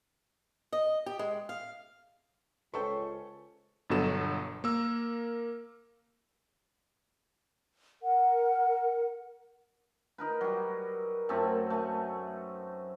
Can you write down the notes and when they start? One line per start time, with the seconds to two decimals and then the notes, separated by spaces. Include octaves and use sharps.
0.72 D#5
1.06 G4
1.19 G#3
1.49 F5
2.74 C#2 C#4 A4 B4 C5 G5 C#6
3.90 G1 G2 B2 F#3 A4 E7
4.64 A#3 A#4 E6
8.03 A#4 F#5
10.18 D#4 A#4 B4
10.41 F#3 G3
11.29 F#2 A3 C4 A4
11.70 A3 G#5